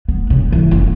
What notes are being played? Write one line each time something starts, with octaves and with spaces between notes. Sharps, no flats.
B3
C#3
E3
F#1